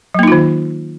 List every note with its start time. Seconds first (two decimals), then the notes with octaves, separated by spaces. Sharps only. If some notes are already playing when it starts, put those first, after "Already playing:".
0.14 F#3
0.19 A#3
0.23 D#4
0.28 F4
0.32 D#3